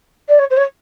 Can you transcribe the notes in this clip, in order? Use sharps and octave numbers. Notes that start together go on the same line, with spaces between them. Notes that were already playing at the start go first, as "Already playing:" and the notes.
D5
C#5
C5
C#5